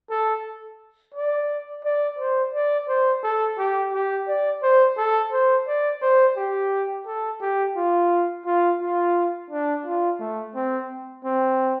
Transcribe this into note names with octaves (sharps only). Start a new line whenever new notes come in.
A4
D5
D5
C5
D5
C5
A4
G4
G4
D5
C5
A4
C5
D5
C5
G4
A4
G4
F4
F4
F4
D4
F4
A3
C4
C4